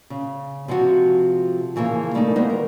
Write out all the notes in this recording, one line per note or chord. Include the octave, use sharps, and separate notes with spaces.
C#3
C3 F3 G#3 F#4
C#3 E3 F3 A#3
G3 A3 A#3 C#4 D#4
D#3 G3 A#3 B3 D#4 C5
A#4